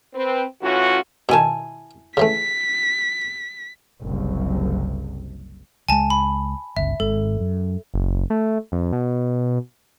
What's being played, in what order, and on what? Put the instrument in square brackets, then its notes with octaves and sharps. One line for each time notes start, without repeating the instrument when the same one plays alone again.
[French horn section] C4 B4
A2 E3 C#4 F4 F#4
[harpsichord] B2 D#3 [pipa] E4 G#5 A5
[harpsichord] C#3 E3 A3 [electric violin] B6
[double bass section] F#1 C2
[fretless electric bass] C#2 G#3 [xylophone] G#5 A5
[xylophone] B5
[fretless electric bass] G1 C#2 [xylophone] E5
[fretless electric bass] G#1 G#2 [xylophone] A4
[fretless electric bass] F#2
[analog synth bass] F#1
A3
F2
B2